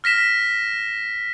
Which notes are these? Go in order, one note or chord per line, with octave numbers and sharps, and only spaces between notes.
F6 A#6 B6 E7